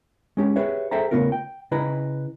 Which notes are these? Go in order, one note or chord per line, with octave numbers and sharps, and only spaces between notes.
G#3 C#4 G4
G4 G#4 B4 C#5 E5
G#4 A4 C5 E5 G5 A#5
C#3 F3 A3 B3 F4 A#4
G5
C#3 E4 B4 D#5 A#5